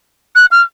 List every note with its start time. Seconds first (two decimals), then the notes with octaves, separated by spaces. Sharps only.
0.36 F#6
0.51 F6